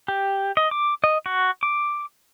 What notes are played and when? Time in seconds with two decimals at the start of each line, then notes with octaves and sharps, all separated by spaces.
0.08 G4
0.57 D#5
0.71 D6
1.04 D#5
1.26 F#4
1.63 D6